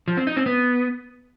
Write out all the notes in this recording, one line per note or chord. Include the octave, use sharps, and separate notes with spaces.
F3
C4
D#4
C4
B3